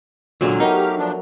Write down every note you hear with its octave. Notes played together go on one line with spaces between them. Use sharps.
C#2 A#2 D3 F#3
A3 B3 D#4 G4 A#4 F6
F3 D4